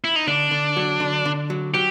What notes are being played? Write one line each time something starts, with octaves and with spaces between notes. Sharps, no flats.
E4
D#4
D3 D4
D3
F#3
D3
D3
F#3
F#3 G4